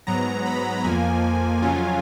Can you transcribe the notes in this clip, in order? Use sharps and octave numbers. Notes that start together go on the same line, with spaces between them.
G#2 F#3 B3 A#5
B5
F2 F3 A#3 G#5
F2 C#3 F#3 C#4 F4